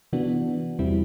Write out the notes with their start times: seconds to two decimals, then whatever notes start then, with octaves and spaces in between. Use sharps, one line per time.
0.13 C3 E3 B3 D4 F#4
0.79 E2 C3 G3 C4 E4